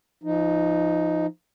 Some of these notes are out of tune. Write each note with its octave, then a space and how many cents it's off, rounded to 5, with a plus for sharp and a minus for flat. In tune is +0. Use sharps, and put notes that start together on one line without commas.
F3 -25 D#4 +0